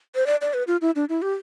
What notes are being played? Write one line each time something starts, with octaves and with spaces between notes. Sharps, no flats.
C5
D5
D5
B4
F4
E4
D4
E4
G4